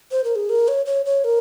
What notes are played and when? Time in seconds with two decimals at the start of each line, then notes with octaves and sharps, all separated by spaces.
0.12 C5
0.24 A#4
0.36 G#4
0.49 A#4
0.68 C#5
0.86 C#5
1.06 C#5
1.24 A#4